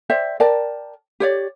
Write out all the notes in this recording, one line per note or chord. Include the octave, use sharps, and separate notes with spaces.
C5 D5 E5 G5
A#4 D5 G5 A5
G4 C#5 D5